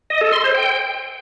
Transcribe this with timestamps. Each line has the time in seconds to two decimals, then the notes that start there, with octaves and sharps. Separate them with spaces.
0.10 D#5
0.21 A4
0.32 C6
0.43 C5
0.54 G5